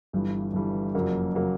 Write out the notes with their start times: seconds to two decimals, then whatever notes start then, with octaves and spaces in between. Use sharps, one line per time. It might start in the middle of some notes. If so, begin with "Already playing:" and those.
0.13 G1 G2 E3 G3
0.53 G1 G2 E3 G3
0.94 F#1 F2 C#3 F#3 A#3
1.35 C#3 F#3 A#3